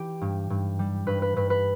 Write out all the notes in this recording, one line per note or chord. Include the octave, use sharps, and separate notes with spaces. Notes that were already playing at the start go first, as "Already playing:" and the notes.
Already playing: E3 G4
G2
G2
G3
G2 B4
B4
G2 B4
B4